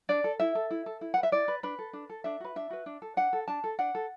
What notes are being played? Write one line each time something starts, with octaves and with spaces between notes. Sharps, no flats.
D4 D5
A4
E4 E5
A4
E4
A4
E4
B4 F#5
E5
E4 D5
B4
D4 B4
A4
D4
A4
D4 E5
F#4 B4
D4 E5
F#4 B4
D4
A4
D4 F#5
A4
D4 A5
A4
D4 F#5
A4